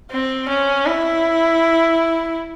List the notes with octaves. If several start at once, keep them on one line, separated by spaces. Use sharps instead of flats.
C4
C#4
E4